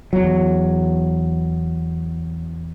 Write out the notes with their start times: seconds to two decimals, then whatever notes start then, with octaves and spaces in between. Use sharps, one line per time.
0.13 E2 F#3